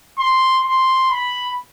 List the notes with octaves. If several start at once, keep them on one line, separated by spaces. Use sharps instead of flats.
C6
C6
B5